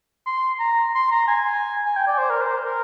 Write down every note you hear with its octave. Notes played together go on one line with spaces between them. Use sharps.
C6
A#5
C6
A#5
G#5
G#5
G5
D5
C5
A#4
C5
A#4